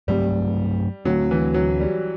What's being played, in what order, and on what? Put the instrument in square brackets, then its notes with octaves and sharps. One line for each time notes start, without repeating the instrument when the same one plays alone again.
[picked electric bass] G2 F#3 A3 C4 [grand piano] G3
[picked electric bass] D2 D3 A3 C4 [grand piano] F#3
[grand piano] E3
F#3
G3